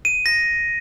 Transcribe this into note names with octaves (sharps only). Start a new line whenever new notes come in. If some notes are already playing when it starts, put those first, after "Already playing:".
D#7
A#6